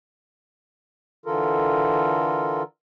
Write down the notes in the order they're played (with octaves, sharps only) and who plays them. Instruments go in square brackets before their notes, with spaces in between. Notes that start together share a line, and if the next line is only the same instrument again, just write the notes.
[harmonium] D3 E3 F4 A4 A#4